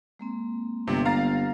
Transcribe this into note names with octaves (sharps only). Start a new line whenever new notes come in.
G#3 A#3 C4
G1 C3
F5 A#5 A6